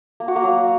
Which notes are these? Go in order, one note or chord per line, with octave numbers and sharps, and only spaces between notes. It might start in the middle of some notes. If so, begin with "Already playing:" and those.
A#3
F#4
A#3
F#3